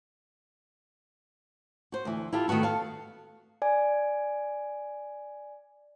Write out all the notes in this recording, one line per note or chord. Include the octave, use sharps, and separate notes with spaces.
F#4 C5
D2 E3
E4 F4 G4 A4
D#3 A3 B3 F#4 A4
A4 F5
D5 G#5